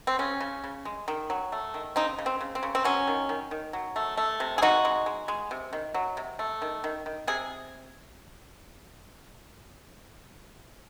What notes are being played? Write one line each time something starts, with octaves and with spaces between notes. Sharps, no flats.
C4
C#3 C#4
C#3
C#3
G#3
D#3
F#3
A3
D#3
C#3 C4 D#4
C#3
C4
C#3
C4
C#3
C4
F#3 C#4
D#3
D#3
D#3
F#3
A3
A3
C3
G#4
G#3 D#4 F#4
G#3
G#3
G#3
C3
D#3
F#3
C3
A3
D#3
D#3
D#3
C3 G#4